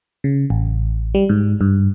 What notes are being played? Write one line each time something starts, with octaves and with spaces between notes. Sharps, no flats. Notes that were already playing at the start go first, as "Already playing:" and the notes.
C#3
A1
G3
G#2
G2